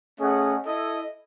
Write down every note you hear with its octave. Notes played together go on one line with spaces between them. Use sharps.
A3 C#4 G#4 D#5 F#5
E4 A4 D#5